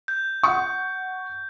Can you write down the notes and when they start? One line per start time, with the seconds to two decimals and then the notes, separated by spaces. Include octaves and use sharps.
0.08 G6
0.43 F#5 C#6